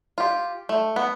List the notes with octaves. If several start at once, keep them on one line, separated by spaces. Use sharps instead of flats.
F4 G4
A3
B3